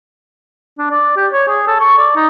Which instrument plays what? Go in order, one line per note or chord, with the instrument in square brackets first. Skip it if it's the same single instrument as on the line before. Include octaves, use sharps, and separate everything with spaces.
[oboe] D4
D5
G4
C#5
G#4
A4
C#6
D5
D#4